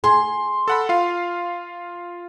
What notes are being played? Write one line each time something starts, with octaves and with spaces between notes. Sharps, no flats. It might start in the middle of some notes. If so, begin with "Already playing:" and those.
G#4 C6
A4 F#5 B5
F4 F5